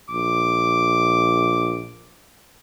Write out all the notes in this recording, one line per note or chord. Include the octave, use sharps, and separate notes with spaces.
A#1 D6